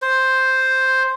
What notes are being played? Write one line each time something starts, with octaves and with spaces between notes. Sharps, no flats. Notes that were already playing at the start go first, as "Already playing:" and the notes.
C5